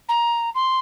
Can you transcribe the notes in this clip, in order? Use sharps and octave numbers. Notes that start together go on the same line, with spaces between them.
A#5
C6